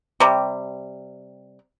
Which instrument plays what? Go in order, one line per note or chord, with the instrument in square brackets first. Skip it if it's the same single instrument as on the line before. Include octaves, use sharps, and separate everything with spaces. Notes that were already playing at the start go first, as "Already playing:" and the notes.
[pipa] C3 G3